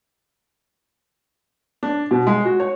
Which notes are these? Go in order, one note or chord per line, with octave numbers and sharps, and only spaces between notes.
D4
B2
G#3
F#4
C#5